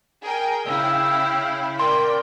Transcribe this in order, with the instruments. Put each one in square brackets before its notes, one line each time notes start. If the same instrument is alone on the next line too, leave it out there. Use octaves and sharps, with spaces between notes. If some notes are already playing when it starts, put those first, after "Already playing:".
[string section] G#4 A#4 G5
[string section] C#3 E4 [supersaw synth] F5 G5 [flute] E6
[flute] A#4 [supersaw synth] D5 [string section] G5 [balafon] C6